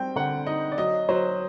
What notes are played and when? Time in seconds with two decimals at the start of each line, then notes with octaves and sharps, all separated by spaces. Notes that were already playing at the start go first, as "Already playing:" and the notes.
Already playing: G3 C4 G5
0.16 D3 F#5
0.47 D#4 D#5
0.72 D5
0.78 F#3 D#5
1.09 F#3 C5